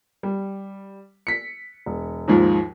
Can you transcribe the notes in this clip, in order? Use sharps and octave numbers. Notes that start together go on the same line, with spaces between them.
G3
B6 C#7
E1
D#2 G#2 F3